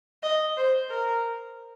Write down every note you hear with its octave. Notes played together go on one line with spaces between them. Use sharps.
D#5
C5
A#4